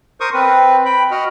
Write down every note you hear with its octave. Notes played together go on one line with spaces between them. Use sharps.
A#4 C5 C#6 D#6
C4 B4
G5 B5
F#4 D#5 F6